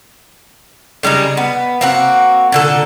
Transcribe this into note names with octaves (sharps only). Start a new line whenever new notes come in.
C#3 G3 G#3 D#4
B3
A#3 C4 F#4
A#2 D3 A4